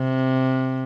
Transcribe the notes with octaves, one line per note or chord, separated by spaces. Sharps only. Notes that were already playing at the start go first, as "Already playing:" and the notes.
Already playing: C3